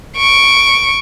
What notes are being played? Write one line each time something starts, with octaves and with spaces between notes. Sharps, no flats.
C#6 D7